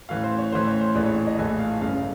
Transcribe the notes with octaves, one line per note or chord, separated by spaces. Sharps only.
A1 A2 E3 F5
C5
C#5
A1 A2 E3 C5
C#5
C5
A#1 A2 E3 D5
C#5
C#5
D#5
A#1 A2 E3 G#5
F5
G1 F#2 C#3 F5